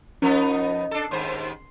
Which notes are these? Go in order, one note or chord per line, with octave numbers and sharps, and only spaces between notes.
F3 B3 C#4 D#4 A#4
D4 A4
D#2 G#2 C5 C6